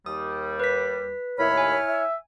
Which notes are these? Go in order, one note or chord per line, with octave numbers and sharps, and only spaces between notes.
D#2 G3 D#6
B4 B6
D#2 A2 E4 C#5 B5 F6
G#5
E5